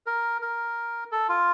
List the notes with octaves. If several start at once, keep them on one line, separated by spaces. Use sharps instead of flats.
A#4
A#4
A4
F4